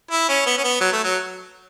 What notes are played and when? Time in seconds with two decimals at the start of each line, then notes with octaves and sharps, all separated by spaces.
0.11 E4
0.28 C#4
0.46 B3
0.58 C#4
0.64 B3
0.80 F#3
0.92 A3
1.04 F#3